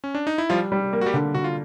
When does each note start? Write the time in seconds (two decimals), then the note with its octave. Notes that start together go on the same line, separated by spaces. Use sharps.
0.04 C#4
0.15 D4
0.27 D#4
0.38 E4
0.50 F3 G3 F4
0.72 G3
0.93 A#3
1.01 F#4
1.06 G3 G4
1.14 D3
1.35 D3 F#4
1.44 F4